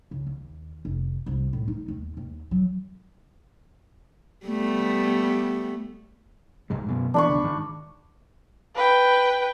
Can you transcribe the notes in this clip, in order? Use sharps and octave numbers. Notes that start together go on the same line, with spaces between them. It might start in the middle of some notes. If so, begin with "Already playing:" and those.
C#2
D#2
F1
C2
A2
D#4
D#2
D#2
F#3
G3 A3 B3
C2 G#2 G#3
F#2 B2 B3
E3 B3 D4 B5 C#6
C2 D3
G#2 D#3
B4 G5